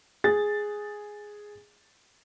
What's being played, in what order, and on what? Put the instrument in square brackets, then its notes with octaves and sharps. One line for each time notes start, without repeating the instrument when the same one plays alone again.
[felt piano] G#4 A6